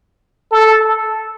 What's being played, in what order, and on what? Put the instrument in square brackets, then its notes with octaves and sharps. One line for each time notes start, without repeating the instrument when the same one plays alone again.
[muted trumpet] A4